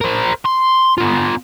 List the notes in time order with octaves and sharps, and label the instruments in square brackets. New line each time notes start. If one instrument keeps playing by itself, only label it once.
[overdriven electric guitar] A#4 C5
C6
B3 F4